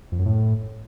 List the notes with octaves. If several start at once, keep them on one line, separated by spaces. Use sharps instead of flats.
F2
F#2
A2